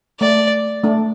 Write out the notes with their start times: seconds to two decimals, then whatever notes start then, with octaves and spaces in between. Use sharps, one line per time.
0.20 A3 D5
0.84 A3 D4